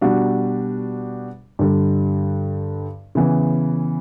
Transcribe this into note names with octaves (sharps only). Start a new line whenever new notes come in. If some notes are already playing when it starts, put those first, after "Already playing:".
B2 G3 D4 F#4
G2 D3 G3
C#3 E3 B3